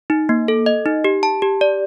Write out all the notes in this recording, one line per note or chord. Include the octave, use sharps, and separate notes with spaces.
D#4
A#3
A4
D#5
D#4
G4
A5
G4
D5